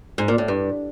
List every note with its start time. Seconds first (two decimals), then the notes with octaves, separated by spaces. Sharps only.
0.18 G#2
0.28 A#2
0.38 A2
0.48 G2